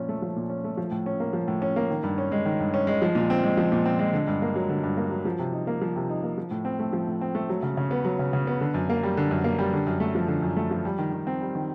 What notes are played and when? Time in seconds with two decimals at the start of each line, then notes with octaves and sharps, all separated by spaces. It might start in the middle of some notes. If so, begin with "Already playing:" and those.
Already playing: A#2 F3 C#4
0.09 A3
0.22 F3
0.36 A#2
0.50 C#4
0.64 A3
0.77 F3
0.91 A2
1.06 C#4
1.20 A#3
1.33 F3
1.48 A2
1.62 C#4
1.76 A#3
1.90 D#3
2.03 G2
2.18 C#4
2.32 G#3
2.45 D#3
2.60 G2
2.74 C#4
2.87 G#3
3.02 F3
3.15 A#2
3.30 C4
3.43 G#3
3.57 F3
3.72 A#2
3.86 C4
3.99 G#3
4.13 D3
4.27 G2
4.42 A#3
4.56 F#3
4.69 D3
4.83 G2
4.97 A#3
5.11 F#3
5.25 F3
5.39 C3
5.53 D#4
5.67 A#3
5.82 F3
5.96 C3
6.09 D#4
6.23 A#3
6.38 F3
6.51 A2
6.65 C4
6.79 A3
6.93 F3
7.07 A2
7.21 C4
7.35 A3
7.50 F#3
7.63 C#3
7.77 C#3
7.91 B3
8.05 F#3
8.19 C#3
8.33 C#3
8.47 B3
8.61 D3
8.74 F#2
8.90 A#3
9.03 G3
9.17 D3
9.31 F#2
9.44 A#3
9.59 G3
9.73 D3
9.87 F#2
10.00 A3
10.15 F3
10.28 D3
10.42 F#2
10.57 A3
10.71 F3
10.85 G3
10.99 D#3
11.12 D#3
11.27 C4
11.41 G3
11.55 D#3